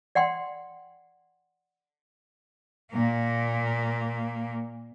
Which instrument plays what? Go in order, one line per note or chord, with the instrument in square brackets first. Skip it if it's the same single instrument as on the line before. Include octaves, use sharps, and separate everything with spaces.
[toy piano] D5 F#5 G5 C6
[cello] A#2 A#3